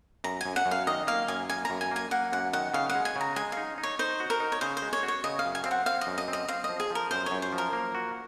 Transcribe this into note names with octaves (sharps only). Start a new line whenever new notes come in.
F#2 A#5
F#2 G#5
F#5
F#2
F5
D#3 D#5
A#3 F5
F#2 G#5
A#3 G#5
A#5
F#2
G#5
A#3 G#5
A#3 F#5
F#2 F#5
D#3 F#5
C#3 F5
F#5
G#3
G#5
C#3 A#5
G#3 G#5
D#4 F5
D#4
C#5
D#4 C5
F#4
A#4
D#4
C#5
C#3 C5
C5
G#3
C#5
F#4
C#5
C#3 D#5
F5
F#2
G#5
C4 F5
F#5
C4 F5
D#5
F#2
D#5
C4
D#5
C4 F5
D#5
F3
G#4
F3 A#4
F#2 C5
F#2 C#5
C5
F3
A#4
A#3
F#4